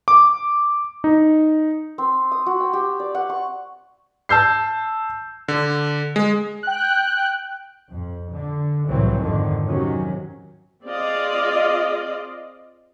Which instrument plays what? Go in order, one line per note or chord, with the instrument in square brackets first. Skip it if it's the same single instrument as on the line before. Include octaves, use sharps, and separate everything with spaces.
[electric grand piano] D6
D#4
[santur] C4
D#6
F#4
G5
G4
D5
F#5
C#6
[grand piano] A5 E6 G6 C7
[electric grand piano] D3
G#3
[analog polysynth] G5 F#6
[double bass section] F2
D3
C2 A2 E3 F#3 C4
F2 G#2 D3 D#3
C3 D#3 F#3 C#4
[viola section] C4 F4 G#4 D5 D#5 F5